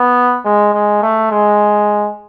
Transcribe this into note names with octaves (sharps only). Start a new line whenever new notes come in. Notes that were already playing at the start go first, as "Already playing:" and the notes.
Already playing: B3
G#3
G#3
A3
G#3